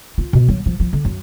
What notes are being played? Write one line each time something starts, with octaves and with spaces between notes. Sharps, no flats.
F4
B2
F#3
F3
F3
D3
F#2